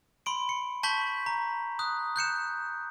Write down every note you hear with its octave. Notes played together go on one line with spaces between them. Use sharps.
B5 C6 D7
C#7
A5 C#6 G6 B6 F#7 G7
A#5
D#6 F#6
F#6 G6 C#7 E7